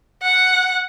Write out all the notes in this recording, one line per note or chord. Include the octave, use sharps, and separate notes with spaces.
F#5